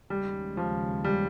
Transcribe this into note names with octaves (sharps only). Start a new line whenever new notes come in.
D#2 C#3 G3 G#3
F3
G3